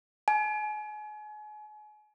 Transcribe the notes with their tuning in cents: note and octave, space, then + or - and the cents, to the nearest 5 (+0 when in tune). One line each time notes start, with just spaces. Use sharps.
G#5 +35